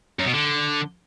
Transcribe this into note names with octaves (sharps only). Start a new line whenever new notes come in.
F#2
B2
D3